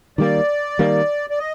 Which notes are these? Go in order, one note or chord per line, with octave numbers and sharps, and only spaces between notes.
D#3 G3 A#3 D5
D#3 G3 A#3
D5
D#5